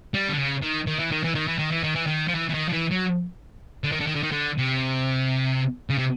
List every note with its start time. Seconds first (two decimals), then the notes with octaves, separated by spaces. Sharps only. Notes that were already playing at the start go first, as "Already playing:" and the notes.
0.14 G3
0.29 D3
0.38 C#3
0.62 D#3
0.87 D#3
1.00 E3
1.12 D#3
1.24 E3
1.35 D#3
1.48 E3
1.58 D#3
1.71 E3
1.83 D#3
1.95 E3
2.07 D#3
2.28 F3
2.35 E3
2.49 E3
2.54 D#3
2.69 F3
2.73 E3
2.91 F#3
3.84 D3
3.92 D#3
4.00 D3
4.07 D#3
4.15 D3
4.23 D#3
4.31 D3
4.58 C3
5.90 C#3
5.98 C3